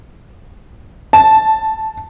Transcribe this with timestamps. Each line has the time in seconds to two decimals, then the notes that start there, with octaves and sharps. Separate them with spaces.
1.13 A5